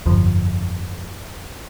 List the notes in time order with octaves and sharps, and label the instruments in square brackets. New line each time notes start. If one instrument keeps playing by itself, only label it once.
[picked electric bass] G1 F2 F3